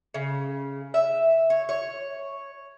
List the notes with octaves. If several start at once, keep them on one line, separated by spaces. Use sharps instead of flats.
C#3
E5
C#5
C#5